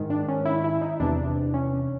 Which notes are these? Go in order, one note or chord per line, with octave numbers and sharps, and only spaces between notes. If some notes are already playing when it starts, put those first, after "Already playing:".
Already playing: G#2 D#3
D4
C#4
E4
E4
D#4
E2 C3 E3 D4
C#4